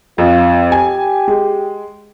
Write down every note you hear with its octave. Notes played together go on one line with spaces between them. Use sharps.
F2 F4
G4 G#5
G#3